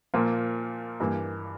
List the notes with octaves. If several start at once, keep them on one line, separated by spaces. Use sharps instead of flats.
A#2 F3 A#3 F4 A#4
G2 E3 A#3